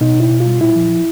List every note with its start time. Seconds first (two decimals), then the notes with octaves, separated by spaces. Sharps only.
0.01 B2 D#4
0.16 B2 E4
0.31 B2
0.40 F4
0.46 G3
0.61 A#2 E4
0.75 F3
0.89 F3